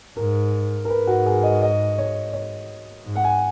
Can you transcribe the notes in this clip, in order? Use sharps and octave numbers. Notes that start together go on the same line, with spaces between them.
G#2 A#4
A#4
G#2 B4
F#4
G#4
D#5
D#5
C#5
C#5
G#2
F#5
G#5